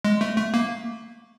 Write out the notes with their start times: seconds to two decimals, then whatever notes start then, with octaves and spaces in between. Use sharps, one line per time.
0.05 G#3
0.21 A3
0.37 A3
0.54 A#3